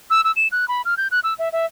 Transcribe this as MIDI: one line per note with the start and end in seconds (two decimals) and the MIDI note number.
0.10 0.21 88
0.24 0.32 88
0.36 0.48 100
0.52 0.67 90
0.68 0.82 83
0.85 0.94 89
0.97 1.08 91
1.11 1.20 90
1.24 1.34 88
1.39 1.49 76
1.52 1.66 76